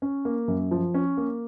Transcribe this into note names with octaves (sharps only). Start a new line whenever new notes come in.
C#4
A#3
F#2
F3
C#4
A#3